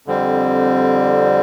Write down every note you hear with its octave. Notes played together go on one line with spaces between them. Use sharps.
F2 D3 G3 C4